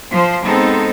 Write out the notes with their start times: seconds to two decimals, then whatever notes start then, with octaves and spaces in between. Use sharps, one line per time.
0.11 F3 C5
0.44 G#3 B3 C4 D#4 A4